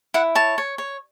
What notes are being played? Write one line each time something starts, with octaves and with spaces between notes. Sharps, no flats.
E4 F#5
C#5 A5
C#5
C#5